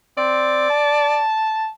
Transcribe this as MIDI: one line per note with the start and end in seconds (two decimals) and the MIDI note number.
0.18 0.69 60
0.18 1.22 74
0.70 1.71 81